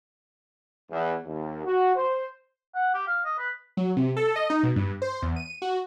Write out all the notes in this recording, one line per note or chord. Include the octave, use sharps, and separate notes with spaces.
E2
D#2
F#4
C5
F#5
G4
F5
D#5
B4
F#3
C3
A4
D#5
D#4
B2
G2
C5
E2
D#7
F#4